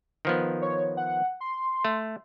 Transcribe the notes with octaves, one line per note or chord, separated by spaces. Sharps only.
D#3 F3 B3
C#5
F#5
C6
A3